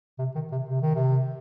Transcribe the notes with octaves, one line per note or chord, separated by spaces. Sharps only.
C3
D#3
C3
C3
D#3
C3